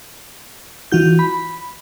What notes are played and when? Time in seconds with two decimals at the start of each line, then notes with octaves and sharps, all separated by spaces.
0.92 E3 F4 F#4 G6
1.19 B5